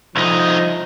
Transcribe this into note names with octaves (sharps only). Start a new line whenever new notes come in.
C2 F3 D#4